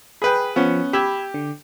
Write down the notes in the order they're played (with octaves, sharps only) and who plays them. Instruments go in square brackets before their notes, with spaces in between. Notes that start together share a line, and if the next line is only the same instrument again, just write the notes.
[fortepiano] G#4 B4 [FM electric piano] G5 B5
[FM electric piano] F3 [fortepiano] B3 C#4
[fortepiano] G4 [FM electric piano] B5 E6 G#6
[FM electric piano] D3